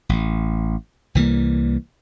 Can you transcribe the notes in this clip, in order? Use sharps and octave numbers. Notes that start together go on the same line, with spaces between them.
A1
C2 E3 G3 A#3